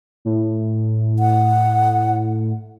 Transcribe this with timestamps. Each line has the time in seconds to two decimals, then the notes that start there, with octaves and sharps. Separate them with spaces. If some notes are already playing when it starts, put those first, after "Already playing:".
0.25 A2
1.19 F#5